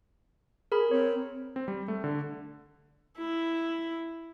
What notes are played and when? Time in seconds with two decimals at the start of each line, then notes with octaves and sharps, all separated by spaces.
0.72 G#4 A#4 B5
0.91 C4 C#5
1.56 C4
1.68 G3
1.88 A3
2.04 D3
3.18 E4